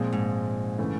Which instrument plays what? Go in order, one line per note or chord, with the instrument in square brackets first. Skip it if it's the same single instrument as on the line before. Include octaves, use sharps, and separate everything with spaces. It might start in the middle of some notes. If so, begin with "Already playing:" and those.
Already playing: [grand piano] A#2 F3 G#3 C4
[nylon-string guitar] G#2
[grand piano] C#3 E3 A3